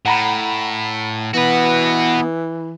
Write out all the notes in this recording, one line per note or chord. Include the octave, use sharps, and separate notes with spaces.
A2 F#5 A#5 B5
E3 B3 F#4 B4